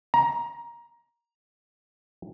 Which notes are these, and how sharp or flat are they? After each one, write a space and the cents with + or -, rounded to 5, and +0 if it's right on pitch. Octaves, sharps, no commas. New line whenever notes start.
A#5 +15